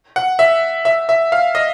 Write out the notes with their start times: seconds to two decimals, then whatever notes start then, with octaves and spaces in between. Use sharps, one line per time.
0.16 F#5
0.39 E5
0.85 E5
1.09 E5
1.32 F5
1.55 D#5